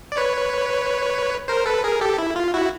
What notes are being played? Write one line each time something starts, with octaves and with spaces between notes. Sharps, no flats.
D5
B4 C#5
A#4 C5
A4 B4
G#4 A#4
G4 A4
E4
F4
E4 F#4